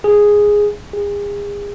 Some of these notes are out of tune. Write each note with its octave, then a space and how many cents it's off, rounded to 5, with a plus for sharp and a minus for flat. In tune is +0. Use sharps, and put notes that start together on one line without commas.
G#4 -5
G#4 -35